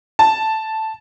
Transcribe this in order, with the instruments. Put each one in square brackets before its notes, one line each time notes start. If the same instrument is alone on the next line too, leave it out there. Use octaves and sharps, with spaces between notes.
[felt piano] A5